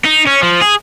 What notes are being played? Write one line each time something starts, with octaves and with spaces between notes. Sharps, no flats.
D#4
C#4
F3
G#4